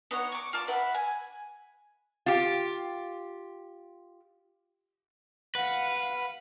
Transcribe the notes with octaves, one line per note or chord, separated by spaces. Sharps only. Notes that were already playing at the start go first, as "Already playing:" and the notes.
B3 D#4 C#5 F#5
C#6 D6
F4 A5 D6
B4 E5 F#5
G#5
F4 G4
B4 F5 F#5